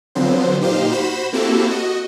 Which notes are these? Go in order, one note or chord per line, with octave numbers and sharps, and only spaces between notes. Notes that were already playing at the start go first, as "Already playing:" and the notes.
D3 F3 F#3 B3 C4 C5
A#2 D#4 G4 C5 F5
F#4 C5 B5 E7
A#3 C4 E4 F#4 G4 A4
F#4 D#5